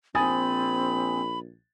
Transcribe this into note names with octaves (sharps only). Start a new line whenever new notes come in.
A#1 C4 G#5 B5 D#6 A6